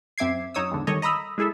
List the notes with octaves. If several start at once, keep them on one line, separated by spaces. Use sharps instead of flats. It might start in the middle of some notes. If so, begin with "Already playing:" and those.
F#2 C4 E5 D6 G#6 C7
F#2 D#4 C#5 D#6 E6
E2 G#2 D3
D#3 G3 A4 C#5 D#5
D#5 A#5 B5 D#6 E6
G#3 E4 G#4 A4 E5